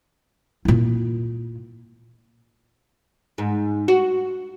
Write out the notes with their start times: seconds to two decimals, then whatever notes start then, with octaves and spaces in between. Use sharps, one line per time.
0.65 A#2 E4
3.38 G#2
3.88 F#4